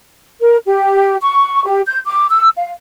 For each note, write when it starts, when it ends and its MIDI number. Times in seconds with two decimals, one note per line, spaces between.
0.42 0.57 70
0.66 1.16 67
1.22 1.64 85
1.65 1.81 67
1.86 1.98 91
2.05 2.25 86
2.30 2.49 88
2.57 2.71 77